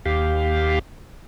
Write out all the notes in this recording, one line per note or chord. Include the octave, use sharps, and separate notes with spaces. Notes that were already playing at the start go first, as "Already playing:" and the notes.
D#2 G4 F5